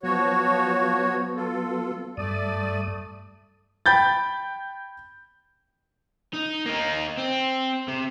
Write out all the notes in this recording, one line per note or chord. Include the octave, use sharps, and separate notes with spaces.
F3 F#3 B3 F#4 C#5
F4 A4
G2 A3 D5 D#6
G5 B5 G6 A6
D#4
A#3 D#4
C4
C3